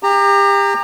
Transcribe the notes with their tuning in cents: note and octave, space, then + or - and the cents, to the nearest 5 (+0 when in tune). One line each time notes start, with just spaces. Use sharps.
G4 +30 A#5 -15